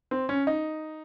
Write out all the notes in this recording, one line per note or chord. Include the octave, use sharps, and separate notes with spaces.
C4
C#4
D#4